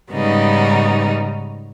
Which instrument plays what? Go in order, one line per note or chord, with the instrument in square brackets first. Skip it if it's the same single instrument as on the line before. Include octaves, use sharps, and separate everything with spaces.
[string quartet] G#2 C#3 G3 B3 D#4